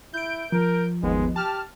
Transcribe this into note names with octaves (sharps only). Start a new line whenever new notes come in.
E4 G6 D7
F3 A#4
G1 D#2 G#3 B3
G4 A5 F6